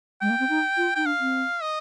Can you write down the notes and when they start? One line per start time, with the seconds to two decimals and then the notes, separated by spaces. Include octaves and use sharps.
0.21 G#3 G5
0.30 A#3
0.39 C4
0.49 D#4
0.77 F4
0.95 D#4 G5
1.05 D4 F5
1.20 C4
1.62 D#5